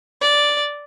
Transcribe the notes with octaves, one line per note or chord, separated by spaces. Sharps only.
D5